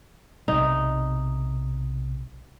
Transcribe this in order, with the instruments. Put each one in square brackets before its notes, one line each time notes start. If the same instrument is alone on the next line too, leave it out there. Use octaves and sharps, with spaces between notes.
[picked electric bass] B1 C3 [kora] D#4